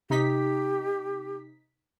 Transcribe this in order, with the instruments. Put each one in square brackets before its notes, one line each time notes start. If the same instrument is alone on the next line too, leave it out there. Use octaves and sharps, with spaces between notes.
[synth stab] C3 D#4 B6 [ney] G4